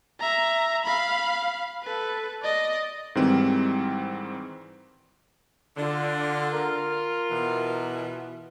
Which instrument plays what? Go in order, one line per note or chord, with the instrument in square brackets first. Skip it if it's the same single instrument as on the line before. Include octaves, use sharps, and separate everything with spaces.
[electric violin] E5 A#5
F5 B5
A4 B4
D5 D#5
[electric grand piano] G#2 D#3 E3 G3 C4
[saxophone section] D3 [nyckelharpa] F4
[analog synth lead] A#4
[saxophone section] B2 E3